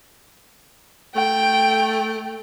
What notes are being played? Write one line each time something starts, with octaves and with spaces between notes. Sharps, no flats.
A3 G5